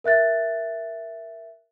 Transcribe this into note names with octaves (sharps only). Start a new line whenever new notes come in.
A#4 E5 F#6 A6